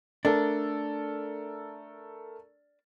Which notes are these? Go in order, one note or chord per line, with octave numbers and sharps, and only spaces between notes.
A3 D4 A4 A#4